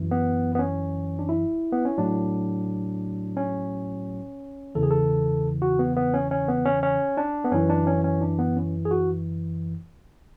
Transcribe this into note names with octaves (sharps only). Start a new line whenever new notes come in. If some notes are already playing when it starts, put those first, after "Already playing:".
Already playing: F#2 E3
B3
B3
C#4
D4
E4
B3
C#4
A2 F#3 D4
C#4
E2 C#3 E3 A4
G#4
A4
F#4
B3
B3
C#4
C#4
B3
C#4
C#4
D4
B3
F#2 E3 C#4
D4
C#4
C#4
D4
B3
C#4
G#4
F#4